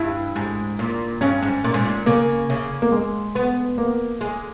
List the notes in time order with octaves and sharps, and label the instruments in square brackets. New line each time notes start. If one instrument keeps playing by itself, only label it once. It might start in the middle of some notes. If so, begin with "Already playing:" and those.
Already playing: [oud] G2 [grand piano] E4
[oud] G#2
A#2
[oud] G2 [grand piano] C#4
[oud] G#2
A#2
G#2
A#2
[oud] C#3 [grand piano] A#3
[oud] C#3
[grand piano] A#3
G#3
[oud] B3
[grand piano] A#3
[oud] G#3